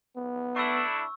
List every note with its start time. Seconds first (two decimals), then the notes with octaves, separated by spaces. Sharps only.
0.16 B3
0.56 A3 D4 E4 C#6 E6